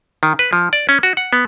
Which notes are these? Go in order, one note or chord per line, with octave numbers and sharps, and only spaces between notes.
D#3
B4
F3
D5
C#4
F#4
F#5
B3